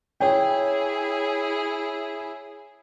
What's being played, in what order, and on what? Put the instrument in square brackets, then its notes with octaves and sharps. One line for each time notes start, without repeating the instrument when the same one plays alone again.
[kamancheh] E4 G#4 [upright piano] C#5 G5